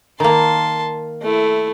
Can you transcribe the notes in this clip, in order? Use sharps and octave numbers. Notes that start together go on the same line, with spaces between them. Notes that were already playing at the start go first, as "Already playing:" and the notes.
D#3 A#3 A5 C6
A3 E4